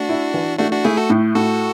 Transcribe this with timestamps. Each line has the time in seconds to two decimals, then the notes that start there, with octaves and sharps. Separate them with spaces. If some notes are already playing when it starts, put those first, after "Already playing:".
Already playing: A3 D4 F#4
0.09 E4
0.34 E3
0.59 A3 D4 F#4
0.72 D4 F#4
0.84 A3 E4 G#4
0.97 F#4 A4
1.10 A2
1.35 A2 F#4 A4